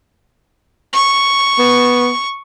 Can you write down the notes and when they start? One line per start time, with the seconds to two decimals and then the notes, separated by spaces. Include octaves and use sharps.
0.93 C#6
1.58 B3